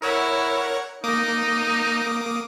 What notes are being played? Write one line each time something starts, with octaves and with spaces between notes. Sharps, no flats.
E4 A#4 C#5 F#5
A#3 D#4 D6 D#6